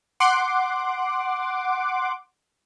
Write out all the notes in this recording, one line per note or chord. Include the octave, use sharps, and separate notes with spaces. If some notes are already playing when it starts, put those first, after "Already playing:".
F#5 C6 D6